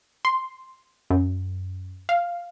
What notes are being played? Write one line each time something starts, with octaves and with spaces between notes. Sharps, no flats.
C6
F#2
F5